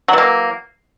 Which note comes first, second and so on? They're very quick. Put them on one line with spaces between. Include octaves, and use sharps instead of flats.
F#3 E3 A#3